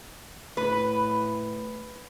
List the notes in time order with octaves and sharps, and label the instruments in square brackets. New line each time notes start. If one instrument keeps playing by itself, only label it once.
[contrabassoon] A2 [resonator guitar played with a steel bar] B4